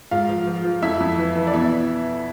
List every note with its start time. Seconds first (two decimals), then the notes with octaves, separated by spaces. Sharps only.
0.11 G#2 F4 F5
0.29 F3
0.47 F3
0.65 F3
0.82 F2 E4 E5
1.00 F2
1.18 E3
1.35 E3
1.47 D5
1.53 B2 E4 E5